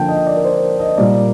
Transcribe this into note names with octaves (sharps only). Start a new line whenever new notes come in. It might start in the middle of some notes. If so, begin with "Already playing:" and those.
Already playing: D3 F3 A#3 G5 A5
D#5
D5
A#4
C5
D#5
A#2 G3 A#3 D5